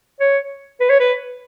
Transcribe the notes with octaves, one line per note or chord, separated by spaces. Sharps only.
C#5
B4
C#5
B4